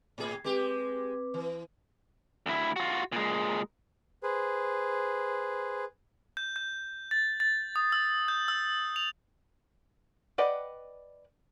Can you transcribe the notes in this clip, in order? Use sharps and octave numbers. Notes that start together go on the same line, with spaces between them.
A2 G#4
G#3 C4 G4 B4 D6
E3
D2 E4
F4 F#4
A#2 G#3
G#4 B4 C5
G6
G6
A6
A6
D#6
E6
G6
E6
F7
B4 D5 D#5 F#5 G5